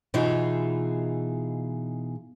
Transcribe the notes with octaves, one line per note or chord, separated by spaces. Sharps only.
B2 E3 D#4 F4 G#4 E5